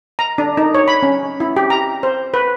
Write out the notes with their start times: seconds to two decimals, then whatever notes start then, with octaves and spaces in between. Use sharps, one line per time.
0.19 A#5
0.38 D4
0.57 D#4
0.75 C#5
0.88 B5
1.03 C#4
1.40 E4
1.56 G4
1.70 A#5
2.03 C5
2.34 B4